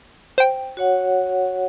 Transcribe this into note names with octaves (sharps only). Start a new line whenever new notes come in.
C5 G5
F#4 C#5 F#5